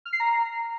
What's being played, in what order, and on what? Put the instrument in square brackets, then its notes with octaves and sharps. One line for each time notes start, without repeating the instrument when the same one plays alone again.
[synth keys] F6
C7
A#5